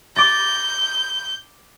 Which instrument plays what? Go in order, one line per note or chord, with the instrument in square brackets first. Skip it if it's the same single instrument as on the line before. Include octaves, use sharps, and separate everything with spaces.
[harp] D6 A6 A#6 [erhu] G6